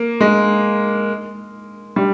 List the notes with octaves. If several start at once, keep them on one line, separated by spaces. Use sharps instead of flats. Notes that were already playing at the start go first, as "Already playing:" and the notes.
Already playing: A#3
G#3
G3